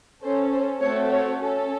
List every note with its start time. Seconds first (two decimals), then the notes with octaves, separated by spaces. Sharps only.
0.23 C#4 A4 C5
0.52 C5
0.82 A3 C4 F#4 A4 C#5
1.11 C#5
1.40 C#4 A4